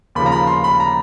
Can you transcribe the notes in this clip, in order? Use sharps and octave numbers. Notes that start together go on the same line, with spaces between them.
D#2 C#3 F3 B5
A#5
B5
C6
B5
A#5